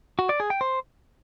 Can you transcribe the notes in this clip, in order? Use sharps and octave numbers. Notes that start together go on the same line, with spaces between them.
F#4
D5
G#4
G5
C5